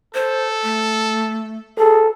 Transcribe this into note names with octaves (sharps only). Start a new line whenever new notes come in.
A4 C5
A3
G#4 A4